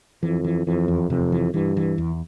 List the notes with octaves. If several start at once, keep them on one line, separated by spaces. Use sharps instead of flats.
F2 E3
E3
F2 E3
E2
F2 C3
E3
G2 E3
E3
E2